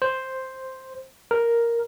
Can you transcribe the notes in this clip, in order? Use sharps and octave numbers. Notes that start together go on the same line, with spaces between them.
C5
A#4